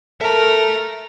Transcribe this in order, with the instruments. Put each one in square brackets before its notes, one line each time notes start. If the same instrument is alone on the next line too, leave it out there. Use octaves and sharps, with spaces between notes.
[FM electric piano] A4 [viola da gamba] A#4 [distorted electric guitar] E5 A5